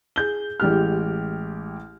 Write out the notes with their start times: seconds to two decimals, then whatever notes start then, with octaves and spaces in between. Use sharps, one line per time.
0.16 G#4 G6 G7
0.60 A1 G#3 G4 F6